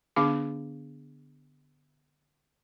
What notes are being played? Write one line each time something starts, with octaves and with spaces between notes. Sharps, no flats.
D3 B3 D4 G#4 F5 D6